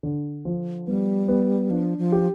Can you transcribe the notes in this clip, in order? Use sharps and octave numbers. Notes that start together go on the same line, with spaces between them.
D3
F3
G3 B3
B3
F3 D4
F3
G4